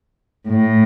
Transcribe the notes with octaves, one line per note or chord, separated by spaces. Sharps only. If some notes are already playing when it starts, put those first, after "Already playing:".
A2